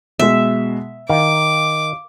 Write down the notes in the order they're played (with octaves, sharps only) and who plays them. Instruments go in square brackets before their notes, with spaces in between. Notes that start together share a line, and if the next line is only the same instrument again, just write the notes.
[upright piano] B2 G#3 [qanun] E5
[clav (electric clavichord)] D#3 [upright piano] F5 [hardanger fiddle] D6